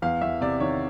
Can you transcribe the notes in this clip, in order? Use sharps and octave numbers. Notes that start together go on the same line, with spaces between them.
E2 F5
E2 E5
C3 D5
D#3 C#5